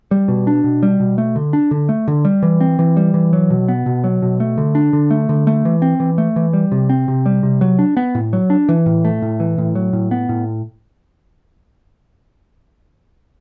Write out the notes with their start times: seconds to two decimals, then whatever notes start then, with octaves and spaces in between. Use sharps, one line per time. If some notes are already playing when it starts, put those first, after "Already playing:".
0.11 G3
0.28 B2
0.47 D4
0.64 B2
0.83 G3
1.00 B2
1.18 A3
1.36 D3
1.53 D4
1.71 D3
1.89 A3
2.08 D3
2.25 G3
2.43 E3
2.60 C4
2.79 E3
2.97 G3
3.14 E3
3.33 F#3
3.50 B2
3.68 B3
3.86 B2
4.04 F#3
4.22 B2
4.40 A3
4.58 D3
4.75 D4
4.93 D3
5.11 A3
5.29 D3
5.47 A3
5.65 E3
5.82 C4
6.00 E3
6.18 A3
6.36 E3
6.53 G3
6.72 C3
6.89 C4
7.08 C3
7.26 G3
7.43 C3
7.61 F#3
7.79 D4
7.97 B3
8.15 A2
8.33 F#3
8.50 D4
8.69 E3
8.86 A2
9.05 A3
9.22 A2
9.40 E3
9.58 A2
9.75 F#3
9.93 A2
10.11 B3
10.29 A2